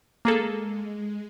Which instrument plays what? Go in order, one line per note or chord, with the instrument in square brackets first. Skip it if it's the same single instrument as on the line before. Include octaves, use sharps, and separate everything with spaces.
[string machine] G#3 [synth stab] A#3 G#4 A4